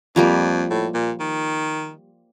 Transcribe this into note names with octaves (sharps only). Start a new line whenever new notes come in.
F2 F3 G3 A#3
A2
A#2
D#3